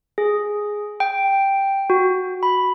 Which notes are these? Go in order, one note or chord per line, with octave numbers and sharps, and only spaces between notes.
G#4
G5
F#4
B5